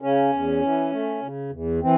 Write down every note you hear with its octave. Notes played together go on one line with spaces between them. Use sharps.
C#3 C#4
E2
E3
A3
C#3
E2
E3 C4